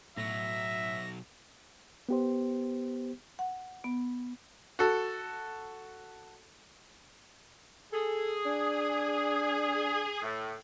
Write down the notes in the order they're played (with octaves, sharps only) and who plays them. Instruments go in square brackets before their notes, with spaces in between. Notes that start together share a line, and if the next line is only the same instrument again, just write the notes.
[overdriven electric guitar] B1 F#3 [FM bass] A2 [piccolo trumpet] E5 [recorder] A#6
[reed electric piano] B3 G4 C5
[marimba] F#5
B3
[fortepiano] F#4 A4
[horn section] G#4 [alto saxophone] A4
[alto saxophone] D4
[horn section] A2